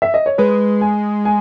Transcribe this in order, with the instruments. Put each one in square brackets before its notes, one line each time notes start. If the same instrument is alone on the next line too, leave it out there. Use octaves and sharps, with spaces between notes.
[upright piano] E5
D#5
C#5
[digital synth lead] G#3 [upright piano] B4
[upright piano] G#5
G#5